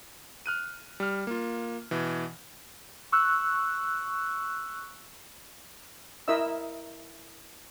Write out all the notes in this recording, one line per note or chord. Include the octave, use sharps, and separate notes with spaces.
F6 F#6 D#7
G3 F6
A#3 F4
B2 E3
C#6 E6 F#6
E4 A#4 D#5 E5 E6